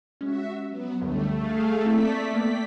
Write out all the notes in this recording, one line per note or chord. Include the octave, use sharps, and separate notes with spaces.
G#3 C#4 F#4 E5
F#3 B3
C#2 F#2 D3 F3 G3 A3
G#4 F5
A#3 C4 E4 D5 B6
A#3 B3 G5